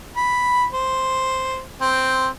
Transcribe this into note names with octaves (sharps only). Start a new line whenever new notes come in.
B5
C5
C4